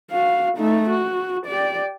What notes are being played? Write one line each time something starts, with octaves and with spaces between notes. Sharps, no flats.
F#4 F5
A3 D#4
F#4
G4 D5